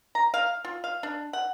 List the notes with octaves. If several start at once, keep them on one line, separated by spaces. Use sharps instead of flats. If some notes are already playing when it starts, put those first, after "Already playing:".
A#5
F5
F4
F5
D4
F#5